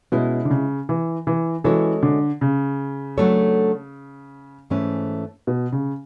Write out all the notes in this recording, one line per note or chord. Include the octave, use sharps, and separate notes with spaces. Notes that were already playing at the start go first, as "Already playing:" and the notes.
B2 G#3 C#4 E4
D3
C#3
E3
E3
E3 G#3 C#4 F#4 A4 C#5
D3
C#3
F#3 A3 D4 A4 C#5
G#2 E3 A3 C#4
B2
C#3